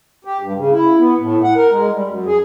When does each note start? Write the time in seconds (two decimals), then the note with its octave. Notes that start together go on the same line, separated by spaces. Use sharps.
0.25 G4
0.40 G2
0.56 C#3
0.71 E4
0.99 B3
1.19 A2
1.43 F#5
1.56 A#4
1.72 G#3
1.93 G3
2.08 F#2
2.26 G#4